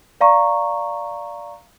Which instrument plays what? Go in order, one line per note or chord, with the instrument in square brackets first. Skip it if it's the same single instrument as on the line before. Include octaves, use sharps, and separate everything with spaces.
[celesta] D5 F5 A#5 C#6